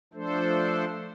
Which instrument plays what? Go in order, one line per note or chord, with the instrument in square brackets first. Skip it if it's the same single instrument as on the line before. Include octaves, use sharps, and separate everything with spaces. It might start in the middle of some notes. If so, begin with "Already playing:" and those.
[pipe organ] F3 A3 D4 A4 C5